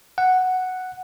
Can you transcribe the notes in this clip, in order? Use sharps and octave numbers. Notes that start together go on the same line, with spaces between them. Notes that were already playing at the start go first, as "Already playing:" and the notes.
F#5